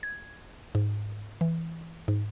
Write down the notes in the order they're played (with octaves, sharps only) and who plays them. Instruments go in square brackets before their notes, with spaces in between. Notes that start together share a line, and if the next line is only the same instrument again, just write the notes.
[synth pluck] G#6
G#2
E3
G#2